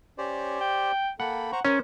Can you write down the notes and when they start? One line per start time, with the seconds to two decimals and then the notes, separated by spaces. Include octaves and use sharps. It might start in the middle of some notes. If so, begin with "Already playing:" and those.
0.18 C#4 G4 C5 D5
0.61 G5
1.20 A#3 A4 F#5 G5 B5
1.52 C5 F#5 A#5 C#6
1.65 C#4 A#4 C5